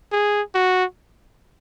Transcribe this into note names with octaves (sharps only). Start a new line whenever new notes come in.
G#4
F#4